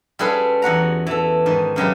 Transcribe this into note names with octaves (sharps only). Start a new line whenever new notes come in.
G3 C#4 F4 G#4 A4 B4
E2 F#4 F#5 A#5
E3 A4
G#2 D#3
F#2 C#3 G4 B4